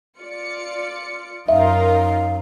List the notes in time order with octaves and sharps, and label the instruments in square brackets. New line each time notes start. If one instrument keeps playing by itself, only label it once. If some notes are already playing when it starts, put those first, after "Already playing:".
[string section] F4 D5 C#7
[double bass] F#2 [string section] D#4 F4 A#4 [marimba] E5 [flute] F5